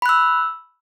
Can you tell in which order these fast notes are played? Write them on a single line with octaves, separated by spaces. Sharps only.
B5 F#6 E6